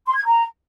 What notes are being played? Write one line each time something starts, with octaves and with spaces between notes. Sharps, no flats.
C6
G#6
A#5